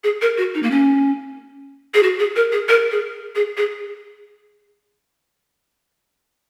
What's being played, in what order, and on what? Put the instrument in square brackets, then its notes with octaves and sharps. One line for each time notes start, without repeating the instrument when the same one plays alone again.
[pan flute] G#4
A#4
F#4
D#4
A#3
C#4
G#4
F#4
G#4
A#4
G#4
A#4
G#4
G#4
G#4